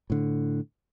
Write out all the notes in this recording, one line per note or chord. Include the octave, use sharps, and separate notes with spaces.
A2 D3